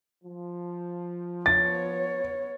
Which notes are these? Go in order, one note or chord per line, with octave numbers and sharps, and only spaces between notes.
F3
B3 C#5 A6